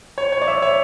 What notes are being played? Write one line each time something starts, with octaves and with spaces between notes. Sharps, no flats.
C#5
C#5
D5
E5
C#5